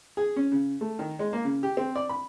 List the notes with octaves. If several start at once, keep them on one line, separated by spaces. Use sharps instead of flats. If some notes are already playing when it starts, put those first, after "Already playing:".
G#4
C#4
C#3
A3
D#3
G#3
A#3
C#3
G4
C4
D5
B5